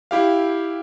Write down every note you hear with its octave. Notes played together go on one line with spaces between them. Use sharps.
E4 G4 F5